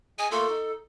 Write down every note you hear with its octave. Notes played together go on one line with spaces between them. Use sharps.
G#4 D#5 G#5
A3 A#3 F4 A4
D#4